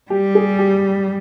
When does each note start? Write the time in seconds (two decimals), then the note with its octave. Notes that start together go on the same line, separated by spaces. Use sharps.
0.10 G3 G4
0.35 G#4
0.59 G4